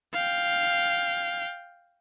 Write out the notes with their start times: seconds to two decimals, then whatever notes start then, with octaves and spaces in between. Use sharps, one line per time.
0.13 F5 G5